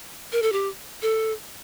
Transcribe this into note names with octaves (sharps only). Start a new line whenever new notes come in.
A#4
A4
G4
A4